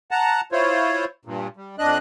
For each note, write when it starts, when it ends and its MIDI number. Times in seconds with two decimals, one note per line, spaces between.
0.11 0.41 78
0.11 0.41 81
0.11 0.41 82
0.52 1.05 64
0.52 1.05 65
0.52 1.05 72
0.52 1.05 73
1.25 1.48 43
1.25 1.48 46
1.57 1.76 55
1.79 1.98 41
1.79 1.98 62
1.79 1.98 75
1.79 1.98 90